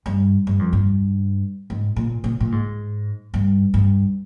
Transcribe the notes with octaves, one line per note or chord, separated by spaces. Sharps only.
G2
G2
F2
G2
G#2
A#2
A#2
A#2
G#2
G2
G2